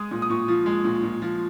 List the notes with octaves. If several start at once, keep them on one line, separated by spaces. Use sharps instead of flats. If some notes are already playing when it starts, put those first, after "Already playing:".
Already playing: G#3 D#6
A#2
D#6
A#2 C#6
F3
G#3
A#2
A#2
F3